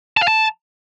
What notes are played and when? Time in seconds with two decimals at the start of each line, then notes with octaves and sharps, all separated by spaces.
0.17 A5
0.22 F5
0.28 A5